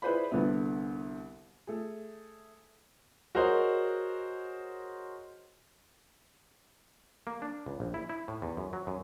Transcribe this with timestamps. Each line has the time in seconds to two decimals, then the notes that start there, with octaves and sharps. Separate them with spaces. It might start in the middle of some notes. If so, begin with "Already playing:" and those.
0.02 E4 G#4 B4 C5 D5 B5
0.31 C2 D3 B3 E5
1.67 A3 G#4
3.35 F#4 G#4 A#4 C5 C#5 D#5
7.27 A#3
7.42 D4
7.66 C#2
7.80 A#1
7.94 E4
8.09 E4
8.28 A2
8.42 E2
8.57 F#2
8.73 F#3
8.87 F#2